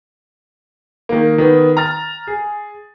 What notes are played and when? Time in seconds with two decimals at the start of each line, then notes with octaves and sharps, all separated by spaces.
1.09 D#3 A#3
1.38 D#3 B3
1.77 A#5 F6 A6
2.27 G#4